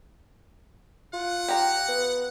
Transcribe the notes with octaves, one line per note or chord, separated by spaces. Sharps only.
F4 F#5
G4 A#5
B3